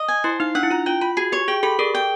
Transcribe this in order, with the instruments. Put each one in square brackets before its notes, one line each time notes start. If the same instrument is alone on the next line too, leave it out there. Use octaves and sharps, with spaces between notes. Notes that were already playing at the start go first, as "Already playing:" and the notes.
Already playing: [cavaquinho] D#5
G#5
[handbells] E4 [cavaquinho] C5
[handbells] D#4 [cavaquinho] F5
[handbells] D4 [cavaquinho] F#5
[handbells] E4
[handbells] F4 [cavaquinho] A#5
[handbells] F4 [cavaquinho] G5
[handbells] F4 [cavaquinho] B5
[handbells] F#4 [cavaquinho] G#4
[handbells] G4 [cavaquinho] C#5
[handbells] G#4 [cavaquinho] G5
[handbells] G4 A4 [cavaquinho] B5
[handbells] G#4 A#4 [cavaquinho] D5
[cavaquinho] G5